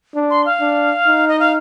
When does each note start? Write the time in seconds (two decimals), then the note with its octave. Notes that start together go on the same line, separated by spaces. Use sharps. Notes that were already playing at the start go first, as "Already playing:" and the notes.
0.15 D4
0.30 C6
0.45 F5
0.60 D4
1.07 D#4
1.28 D#5
1.39 F5